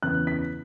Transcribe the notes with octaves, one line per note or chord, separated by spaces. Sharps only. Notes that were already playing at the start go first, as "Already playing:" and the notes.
E2 C#3 E3 B3 F#6
B6